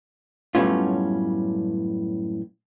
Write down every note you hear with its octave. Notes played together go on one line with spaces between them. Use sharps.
F#2 A2 G3 B3 C#4 F4